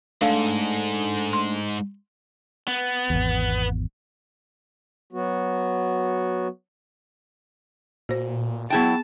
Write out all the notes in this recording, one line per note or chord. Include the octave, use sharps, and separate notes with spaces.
G#2 A3 D4 A4 F5
C6
B3
G#1 E2
F#3 B3 F#4
A#2 F#4 C5
F#3 B3 E4 G#4 G5 A5 A6